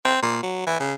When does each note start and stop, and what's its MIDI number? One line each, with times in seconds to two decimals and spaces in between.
0.05 0.21 60
0.22 0.43 46
0.43 0.63 54
0.67 0.76 52
0.80 0.93 49